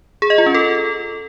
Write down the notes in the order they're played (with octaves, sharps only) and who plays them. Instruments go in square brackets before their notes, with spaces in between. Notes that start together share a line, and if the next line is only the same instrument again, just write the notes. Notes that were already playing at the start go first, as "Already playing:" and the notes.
[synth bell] G#4
D#5
F4
C#4
A4